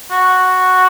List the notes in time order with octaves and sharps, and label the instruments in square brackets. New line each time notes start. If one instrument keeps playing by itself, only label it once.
[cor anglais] F#4